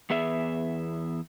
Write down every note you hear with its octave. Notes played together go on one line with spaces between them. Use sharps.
E2 B3 G#4 E5